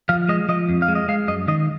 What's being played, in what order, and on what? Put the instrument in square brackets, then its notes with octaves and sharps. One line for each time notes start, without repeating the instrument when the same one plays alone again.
[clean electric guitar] F3 F5
G#3 D#5
F3 D#5
F2
F5
G#3
D#5
G#3 F5
F#2 D#5
D#3 D#5